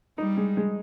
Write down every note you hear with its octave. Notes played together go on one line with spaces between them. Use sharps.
G3 D#4
G#3
G#3